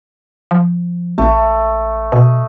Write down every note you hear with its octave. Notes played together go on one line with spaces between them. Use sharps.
F3
A1 A3
B2 D#5